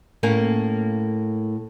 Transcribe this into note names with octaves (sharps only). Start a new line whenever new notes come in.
A2 A#3 C#4